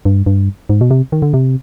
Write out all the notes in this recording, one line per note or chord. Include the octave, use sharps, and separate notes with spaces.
G2
G2
G#2
B2
C3
D#3
D3
C3